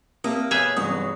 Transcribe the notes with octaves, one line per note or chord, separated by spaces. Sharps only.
A#3 C4 G4 E5 A5 D#6
B2 G#4 B4 C#5 E5 F#6 G6 F7
G1 F#2 C3 E3 F#3 D#6